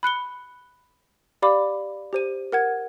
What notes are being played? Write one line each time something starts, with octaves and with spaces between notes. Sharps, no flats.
B5 F#6 C#7 G7
G4 D5 F5 B5 D6
G4 C5 D#7
A#4 F#5 G#6